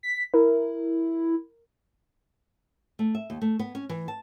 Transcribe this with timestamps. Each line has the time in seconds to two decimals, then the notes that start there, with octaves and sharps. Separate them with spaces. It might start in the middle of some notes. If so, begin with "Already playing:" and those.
0.03 B6
0.34 E4 A#4
2.99 A3
3.15 E5
3.30 D#2
3.42 A3
3.59 B3
3.75 C#4
3.89 E3
4.08 A5